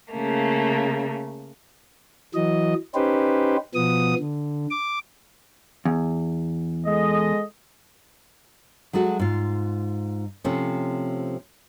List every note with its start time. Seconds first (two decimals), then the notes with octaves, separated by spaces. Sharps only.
0.12 C#3 A3 A#3
2.35 E3 F#3 D#5
2.95 C#4 D#4 G4 B4 C5
3.75 B2 F3 B3 D#6
4.19 D3
4.71 D6
5.85 E2
6.86 G#3 A4 D#5
8.93 F#3 G#3 A3 F#4 A4
9.19 G#2 F4
10.44 C3 F3 A3 C4 C#4